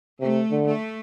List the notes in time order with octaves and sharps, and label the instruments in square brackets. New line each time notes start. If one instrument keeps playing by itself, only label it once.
[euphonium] C3 [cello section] A3
[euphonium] D3
[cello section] A3